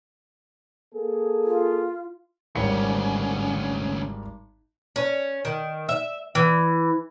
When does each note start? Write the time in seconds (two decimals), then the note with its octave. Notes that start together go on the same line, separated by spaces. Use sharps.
0.95 A#3 G#4 A4
1.45 F4
2.55 G#1 D2 G3 C#4 C#7
4.96 C#4
5.45 D#3
5.89 E5
6.35 E3